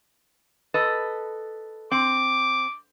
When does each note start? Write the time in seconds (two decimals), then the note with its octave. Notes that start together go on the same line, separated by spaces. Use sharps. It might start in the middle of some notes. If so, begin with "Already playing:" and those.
0.74 A4 B4 D#5
1.91 C4 D6